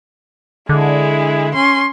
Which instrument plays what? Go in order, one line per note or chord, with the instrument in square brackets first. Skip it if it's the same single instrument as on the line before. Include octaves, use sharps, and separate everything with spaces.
[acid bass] D3 [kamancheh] G#3 E4
[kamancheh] C#4 C6